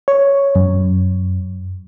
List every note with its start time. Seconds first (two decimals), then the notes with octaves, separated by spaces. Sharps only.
0.08 C#5
0.55 F#2